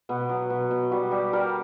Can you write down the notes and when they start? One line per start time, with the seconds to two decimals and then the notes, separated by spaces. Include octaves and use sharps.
0.09 B2 B3
0.29 F#3
0.50 B2
0.71 B2
0.91 G3 F#4
1.11 G3 G4
1.33 G3 A#4